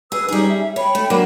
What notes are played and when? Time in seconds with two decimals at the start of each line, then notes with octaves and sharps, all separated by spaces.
0.12 G#4 B4 E6
0.29 G3 C#4 D#4 G#4
0.48 E5
0.76 C#5 G5 B5
0.95 A3
1.10 F#3 A#3 D4